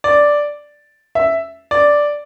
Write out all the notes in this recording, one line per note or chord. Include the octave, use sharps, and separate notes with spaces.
D5
E5
D5